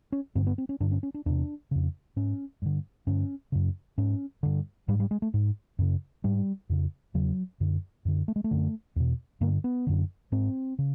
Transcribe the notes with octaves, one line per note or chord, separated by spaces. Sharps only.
C#4
G2 D3 C4
B3
C4
C#4
G2 D3 D4
C#4
C#4
D4
E2 C3 D4
F2 C#3
G#2 C#4
G2 D3
G2 D3 C#4
F#2 C#3
G#2 C#4
G2 D3
G#2 G3
G3
G#3
A3
G#2
F#2 C#3
G#2 G3
F2 C#3
E2 C#3 F#3
F#2 D3
F#2 D3
A3
G#3
A3
F#2 D3
E2 B2
G2 D3 A#3
B3
F#2 D3
G#2 C4
C#3